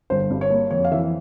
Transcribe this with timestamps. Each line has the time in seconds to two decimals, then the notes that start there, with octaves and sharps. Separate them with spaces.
0.10 G1 C5
0.30 G2
0.41 C#5
0.50 A#3
0.71 F2 C#5
0.85 F5
0.92 E3 E5